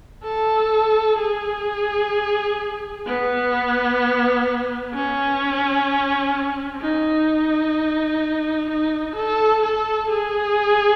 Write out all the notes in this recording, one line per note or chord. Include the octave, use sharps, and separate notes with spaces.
A4
G#4
B3
C#4
D#4
D#4
A4
A4
G#4